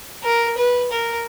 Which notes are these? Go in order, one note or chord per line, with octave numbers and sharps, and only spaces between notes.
A#4
B4
A#4